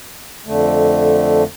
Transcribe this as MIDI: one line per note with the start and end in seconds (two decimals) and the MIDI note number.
0.46 1.43 41
0.46 1.43 50
0.46 1.43 57